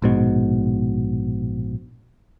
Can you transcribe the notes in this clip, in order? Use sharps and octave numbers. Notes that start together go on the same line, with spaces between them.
A#1 G#2 B2